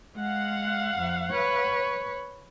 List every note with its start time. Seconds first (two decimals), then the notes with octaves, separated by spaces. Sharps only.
0.17 G#3 F5 F#5
0.98 F2
1.31 B4 C#5